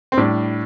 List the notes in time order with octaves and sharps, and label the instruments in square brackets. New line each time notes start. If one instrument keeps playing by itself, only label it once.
[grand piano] C4
A2 G3 D4